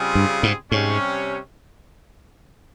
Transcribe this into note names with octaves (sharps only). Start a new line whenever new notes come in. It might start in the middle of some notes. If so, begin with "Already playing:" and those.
Already playing: C#3 G3 C4 F4 G#4
G2
G#2
G#2 C3 G3 C#4